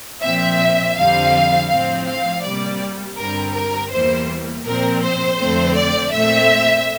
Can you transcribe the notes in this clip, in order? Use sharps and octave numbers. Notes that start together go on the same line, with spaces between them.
A#2 F3 C4 E5
F2 D3 G3 C4 F5
A2 F3 C4 F5
F5
C3 G3 A#3 D5
G2 D3 G3 C4 A#4
A#4
E2 E3 G3 A#3 C5
A#2 F3 C4 A#4
C5
F2 D3 F3 A3 C4
D5
A#2 A3 C4 E5